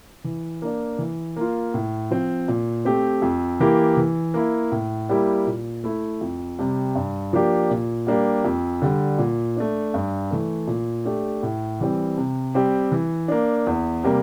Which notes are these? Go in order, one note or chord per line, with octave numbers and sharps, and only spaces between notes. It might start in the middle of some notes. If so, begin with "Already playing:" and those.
E3
A#3 D4
E3
A#3 F4
A2
F3 C4
A#2
A3 C4 G4
F2
E3 A#3 E4 G4
E3
A#3 E4
A2
G3 A#3 E4 G4
A#2
A3 E4
F2
C3 G3
G2
F3 A#3 D4 G4
A#2
G3 A#3 D4 G4
F2
D3 G3
A#2
A3 D4
G2
E3 A3
A#2
A3 D4 G4
A2
E3 G3 C4
C3
G3 C4 G4
E3
A#3 D4
E2
C3 G3 A#3